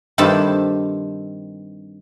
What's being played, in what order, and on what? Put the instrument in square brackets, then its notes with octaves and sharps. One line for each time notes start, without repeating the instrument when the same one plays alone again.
[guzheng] G2 D#3 C4 G4 A4 A5